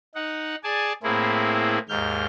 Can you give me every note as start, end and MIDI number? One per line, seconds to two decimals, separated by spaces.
0.15 0.55 63
0.15 0.55 78
0.64 0.93 68
0.64 0.93 74
0.64 0.93 80
0.64 0.93 81
1.03 1.78 45
1.03 1.78 58
1.03 1.78 60
1.03 1.78 64
1.03 1.78 68
1.89 2.26 39
1.89 2.26 44
1.89 2.26 89
1.89 2.26 91